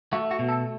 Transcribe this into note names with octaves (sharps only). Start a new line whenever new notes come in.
A3 F#4
F#4
B2
A4